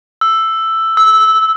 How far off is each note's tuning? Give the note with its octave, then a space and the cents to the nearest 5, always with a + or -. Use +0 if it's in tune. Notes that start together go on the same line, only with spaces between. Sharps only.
E6 +5
E6 -15